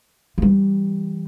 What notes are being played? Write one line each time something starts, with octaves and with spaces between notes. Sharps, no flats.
E3 G3